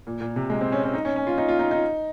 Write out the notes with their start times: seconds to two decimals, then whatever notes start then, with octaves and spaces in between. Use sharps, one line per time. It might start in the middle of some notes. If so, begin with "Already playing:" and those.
0.07 A#2
0.21 A#2
0.36 C3
0.50 G#3
0.61 C4
0.72 C#4
0.83 C#4
0.94 D#4
1.05 C#4
1.16 C#4
1.27 F4
1.38 D#4
1.49 F4
1.59 D#4
1.71 D#4